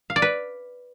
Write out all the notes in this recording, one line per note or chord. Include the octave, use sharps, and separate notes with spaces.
F5
D5
B4